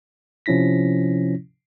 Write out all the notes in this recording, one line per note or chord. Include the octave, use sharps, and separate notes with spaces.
C3 F3 C#4 E4 A#6 B6